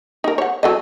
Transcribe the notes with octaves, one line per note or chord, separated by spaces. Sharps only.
D#4 A#4
C#5 F#5
F#3 A4 D#5